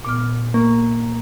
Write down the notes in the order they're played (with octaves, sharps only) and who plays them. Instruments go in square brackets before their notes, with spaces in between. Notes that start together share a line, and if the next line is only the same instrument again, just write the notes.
[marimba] A#2 B3 F6
[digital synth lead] A#3 [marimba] C#6